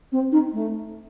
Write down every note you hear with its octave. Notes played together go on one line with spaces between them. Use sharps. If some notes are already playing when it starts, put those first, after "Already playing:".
C4
D#4
A3